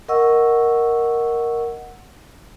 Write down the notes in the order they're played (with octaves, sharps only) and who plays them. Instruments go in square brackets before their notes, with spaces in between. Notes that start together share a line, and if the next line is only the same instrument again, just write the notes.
[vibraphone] A#4 D#5 F#5 C#6 E6